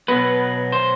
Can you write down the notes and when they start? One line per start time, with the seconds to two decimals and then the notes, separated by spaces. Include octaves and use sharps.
0.08 B2 F#3 B3 B4
0.72 C5